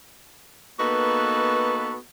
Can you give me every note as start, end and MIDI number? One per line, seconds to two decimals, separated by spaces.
0.78 1.96 58
0.78 1.96 59
0.78 1.96 63
0.78 1.96 66
0.78 1.96 69
0.78 1.96 71